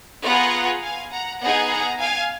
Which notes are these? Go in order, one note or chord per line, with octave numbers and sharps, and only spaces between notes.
B3 F4 G#4 F#5 A#5
F5 G#5
F#5 A#5
B3 D#4 G#4 F#5 A#5
F#5 A#5
F5 G#5